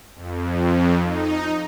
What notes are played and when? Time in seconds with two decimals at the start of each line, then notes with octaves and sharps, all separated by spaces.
0.15 F2
1.03 D#4